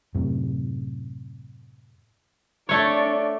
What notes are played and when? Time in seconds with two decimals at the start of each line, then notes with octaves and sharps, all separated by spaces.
0.15 F#2 A2 C3
2.69 A3 D4 C#5 D5